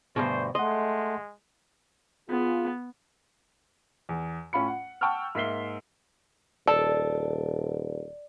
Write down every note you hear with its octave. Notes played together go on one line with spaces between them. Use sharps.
D2 G2 B2 C5
G#3 A3 D#5 F#5 C6
B3 F4 G#4
E2
A2 C#4 F4 B5 C#7
F#5
F#5 G5 A5 C#6 E6 F6
G#2 A#3 E5 B6 C7 G7
D#1 A4 D5